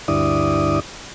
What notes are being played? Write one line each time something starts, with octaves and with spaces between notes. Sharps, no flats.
D2 G2 E4 D5 D#6